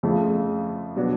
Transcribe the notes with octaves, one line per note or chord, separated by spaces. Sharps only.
F2 C#3 F3 A3
B2 F#3 B3 D4